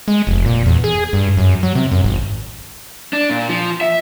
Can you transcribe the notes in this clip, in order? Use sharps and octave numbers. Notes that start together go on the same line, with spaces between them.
G#3
F1
A#2
E2
G#4
G2
F#2
F#3
C3
F#2
G#1
D4
A#2
F3
E5